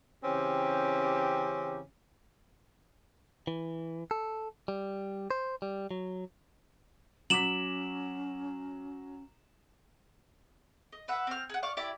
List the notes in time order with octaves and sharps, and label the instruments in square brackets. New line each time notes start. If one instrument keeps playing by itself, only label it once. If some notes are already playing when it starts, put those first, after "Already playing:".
[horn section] C#3 E3 C4 C#4 G4
[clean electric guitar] E3
A4
G3
C5
G3
F#3
[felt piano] F#3 D6 B6 [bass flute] C#4 [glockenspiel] E7 F#7
[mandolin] D#5
B4 E5 F#5
C4 F6
G#4 F#5
D5 F5 C#6
E4 G4 D5